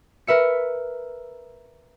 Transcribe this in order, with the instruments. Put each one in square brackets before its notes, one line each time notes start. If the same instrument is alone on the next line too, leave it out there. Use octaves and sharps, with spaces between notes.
[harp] A#4 B4 E5 C#7